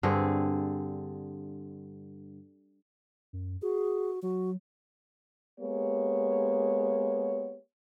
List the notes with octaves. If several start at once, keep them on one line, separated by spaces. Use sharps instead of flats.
G2 D3 C4 G#4
F#2
F#4 G#4
F#3 F#4
G#3 A#3 B3 G4 C#5